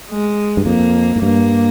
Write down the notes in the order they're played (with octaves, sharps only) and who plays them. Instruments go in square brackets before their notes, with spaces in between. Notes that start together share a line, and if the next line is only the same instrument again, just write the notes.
[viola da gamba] G#3
[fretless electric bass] G2
[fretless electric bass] F2 [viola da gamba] A#3
[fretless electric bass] G#2
[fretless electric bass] G2 [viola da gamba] A#3